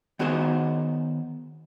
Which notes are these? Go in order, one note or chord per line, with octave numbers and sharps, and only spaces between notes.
D#3 B3 F#4 G#4 C5 D#5